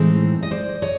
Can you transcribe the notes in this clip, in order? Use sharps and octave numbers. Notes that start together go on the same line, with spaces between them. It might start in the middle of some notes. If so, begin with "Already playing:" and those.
Already playing: A2 E3 G#3 C4 D#4
D#5
C5 D5
C#5 D#5